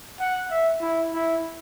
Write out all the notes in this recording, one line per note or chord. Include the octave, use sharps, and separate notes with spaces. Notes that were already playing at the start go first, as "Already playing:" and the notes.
F#5
E5
E4
E4